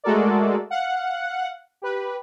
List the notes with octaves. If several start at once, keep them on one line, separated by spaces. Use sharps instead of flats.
G#3 A3 F#4 A4 A#4 D5
F5 F#5
G4 B4